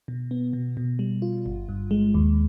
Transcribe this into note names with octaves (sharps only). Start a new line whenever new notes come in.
B2
B3
B2
B2
G3
F4
G1
G2
G#3
D#2